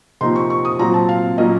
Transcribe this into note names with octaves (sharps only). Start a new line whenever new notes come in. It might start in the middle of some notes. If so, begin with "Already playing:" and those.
C3 F3 A#3 D#4 C6
C#6
C#6
D#6
A#2 F#3 C4 A#5
A5
F5
A#2 F#3 A#3 C#4 D#5